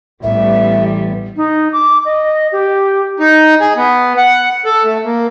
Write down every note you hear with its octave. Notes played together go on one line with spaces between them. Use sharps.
A1 E3 G3 B3 E5
D#4
D6
D#5
G4
D#4
G#4
B3
F#5
A4
A3
A#3